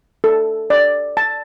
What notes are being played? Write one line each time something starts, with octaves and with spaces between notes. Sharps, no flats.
A4
D5
A5